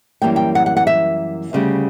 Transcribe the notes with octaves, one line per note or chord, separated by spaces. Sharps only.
F#2 E3 G3 A#3 G5
G5
F#5
F#5
F#5
E5
D2 C#3 G3